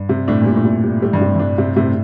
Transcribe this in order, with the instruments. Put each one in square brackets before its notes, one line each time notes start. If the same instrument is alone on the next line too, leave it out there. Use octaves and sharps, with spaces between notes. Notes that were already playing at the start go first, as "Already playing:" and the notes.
Already playing: [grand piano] G2
[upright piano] C3
[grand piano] A2 [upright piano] D4
[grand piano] A#2 [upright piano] G3
[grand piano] A2
[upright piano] C3
G3
[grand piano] A2 [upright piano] G3
[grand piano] G2
[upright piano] C3
[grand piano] G2 [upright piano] D4
[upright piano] C3
[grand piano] A2 [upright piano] C3